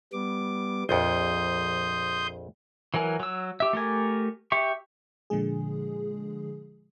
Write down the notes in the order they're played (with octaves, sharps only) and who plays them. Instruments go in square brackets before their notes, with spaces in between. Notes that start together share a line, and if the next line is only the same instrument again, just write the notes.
[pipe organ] G3 B3 D6
[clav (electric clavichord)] A#1 F2 [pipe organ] C6 D#6 G6
[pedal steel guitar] E3 F#3 A#4 G#5
F#3 E6
G4 E5
A3 G4 A#4 G#5
G4 E5 C#6
[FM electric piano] A#2 D3 F3 G#3 G#4